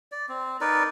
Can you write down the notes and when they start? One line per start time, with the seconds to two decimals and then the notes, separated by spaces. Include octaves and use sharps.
0.12 D5
0.29 C4
0.61 D#4 A#4 B4 D5